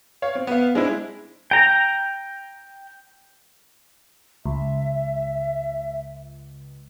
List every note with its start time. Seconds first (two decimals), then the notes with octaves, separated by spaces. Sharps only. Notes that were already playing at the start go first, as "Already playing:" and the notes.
0.22 C#5 F5
0.35 C4
0.47 B3 F5
0.75 G#3 C4 D4 E4
1.51 G5 A#5
4.46 C#2 E5